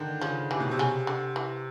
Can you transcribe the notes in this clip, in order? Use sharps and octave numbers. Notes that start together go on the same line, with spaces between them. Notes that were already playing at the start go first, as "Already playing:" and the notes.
Already playing: D3 D#3
C#3 F3
C3 E3
B2
C3
C#3
D3
E3